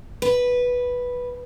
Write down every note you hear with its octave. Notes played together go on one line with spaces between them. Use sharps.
B4